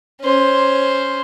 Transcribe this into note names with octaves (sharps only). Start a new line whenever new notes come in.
C#4 C5